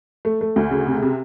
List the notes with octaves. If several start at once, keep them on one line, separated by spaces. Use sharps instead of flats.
A3
A3
D2
C#3
C3
C3